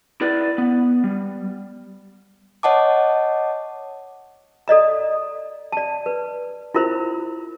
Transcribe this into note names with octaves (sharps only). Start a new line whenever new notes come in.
E4 B4 D5
B3
G3
C#5 D#5 F#5 A5 D6
A4 D5 D#5 A#5
D5 A5
B4
E4 F4 A#4 C5 B5